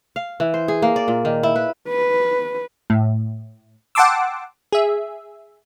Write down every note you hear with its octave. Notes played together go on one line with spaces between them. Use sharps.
F5
E3
C5
G#4
A#3
D5
A#2
D#3
E4
B4
B4
A2
F#5 G5 A5 C6 D6 E6
G#4 E5